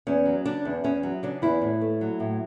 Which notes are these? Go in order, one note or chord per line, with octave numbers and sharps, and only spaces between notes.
E2 C#4
F#3
C#3 D4
E2
E2 C#4
F#3
C#3 D4
E2 E4
A2
A3
F#3
A2